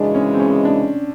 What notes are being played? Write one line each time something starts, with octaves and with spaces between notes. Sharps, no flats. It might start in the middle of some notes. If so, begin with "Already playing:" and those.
Already playing: F#2 C#3 E3 G#3 D4
C#4
C4
C#4
D4